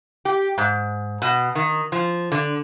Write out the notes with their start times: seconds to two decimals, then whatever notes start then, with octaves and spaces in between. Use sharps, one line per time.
0.25 G4
0.58 G#2
1.22 B2
1.55 D#3
1.92 F3
2.32 D3